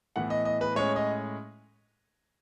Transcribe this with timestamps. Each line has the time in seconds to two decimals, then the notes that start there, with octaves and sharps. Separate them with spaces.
0.16 A2 E3 B3 F#5
0.30 D#5
0.45 D#5
0.61 B4
0.75 A2 G#3 C#4 C#5
0.96 D#5